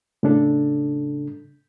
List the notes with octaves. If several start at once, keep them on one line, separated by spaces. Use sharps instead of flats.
A2 C#3 D4 A4